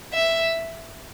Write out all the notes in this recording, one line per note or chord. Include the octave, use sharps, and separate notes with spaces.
E5